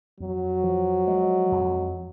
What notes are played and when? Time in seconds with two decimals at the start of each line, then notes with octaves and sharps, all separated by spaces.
0.20 F2 F#3
0.64 F3
1.08 G#3
1.52 F2